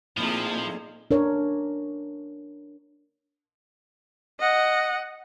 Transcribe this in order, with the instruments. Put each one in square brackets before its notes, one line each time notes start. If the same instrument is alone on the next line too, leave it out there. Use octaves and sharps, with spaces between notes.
[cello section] A#2 C4 G#4 [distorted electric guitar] F3 [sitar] A3 D#4 E4
[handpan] D4 A#4 C#5
[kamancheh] D#5 F#5